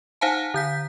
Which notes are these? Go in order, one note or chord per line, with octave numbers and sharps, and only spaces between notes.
D#4 C5 F5 F#5 G#5 A5
D3 G6 B6